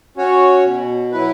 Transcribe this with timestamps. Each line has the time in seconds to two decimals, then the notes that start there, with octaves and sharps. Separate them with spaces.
0.17 C#4 F#4 C#5
0.64 B2
1.11 F#3 E4 B4